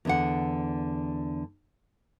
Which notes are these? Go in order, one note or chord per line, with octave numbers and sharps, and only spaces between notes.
E2 D3 F#5